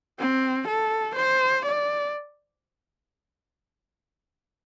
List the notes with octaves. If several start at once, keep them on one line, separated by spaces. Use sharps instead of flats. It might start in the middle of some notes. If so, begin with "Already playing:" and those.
C4
A4
C5
D5